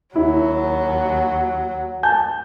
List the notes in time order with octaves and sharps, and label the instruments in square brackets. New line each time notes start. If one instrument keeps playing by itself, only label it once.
[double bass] D#2 [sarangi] F#3 [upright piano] E4
[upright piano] G#5 A5 G6